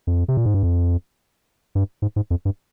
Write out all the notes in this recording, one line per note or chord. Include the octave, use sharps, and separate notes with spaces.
F2
C3
A#2
G#2
G2
F2
G2
G#2
G#2
F2
G2